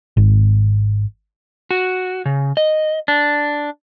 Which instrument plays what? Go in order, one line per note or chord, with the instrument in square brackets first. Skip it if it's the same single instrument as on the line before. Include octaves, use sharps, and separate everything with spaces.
[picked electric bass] G#1
[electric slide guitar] F#4
C#3
D#5
D4